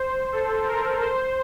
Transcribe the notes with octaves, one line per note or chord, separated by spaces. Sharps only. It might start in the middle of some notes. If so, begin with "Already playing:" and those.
Already playing: C5
A4
A#4
C5